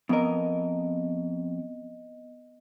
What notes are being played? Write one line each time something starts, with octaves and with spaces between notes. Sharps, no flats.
F2 B3 A#4 D#5